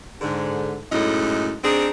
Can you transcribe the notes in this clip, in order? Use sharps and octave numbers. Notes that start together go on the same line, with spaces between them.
G#2 D3
F#2 A2 G#3 D#4
C4 D4 D#4 G#4